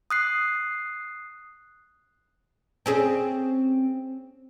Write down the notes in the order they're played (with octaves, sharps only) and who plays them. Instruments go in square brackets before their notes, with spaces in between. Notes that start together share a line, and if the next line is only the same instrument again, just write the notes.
[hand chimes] D#6 F#6 C7
[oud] C4 C#4 G#4